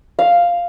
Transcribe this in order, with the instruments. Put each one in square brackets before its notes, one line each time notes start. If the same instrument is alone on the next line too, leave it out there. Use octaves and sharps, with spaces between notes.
[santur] F5